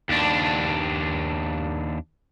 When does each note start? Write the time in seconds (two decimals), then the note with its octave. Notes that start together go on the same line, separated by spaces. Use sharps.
0.09 D#2 D4